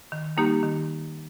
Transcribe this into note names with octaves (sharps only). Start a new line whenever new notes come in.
D#3
G3 A#3 D#4 G4
D#3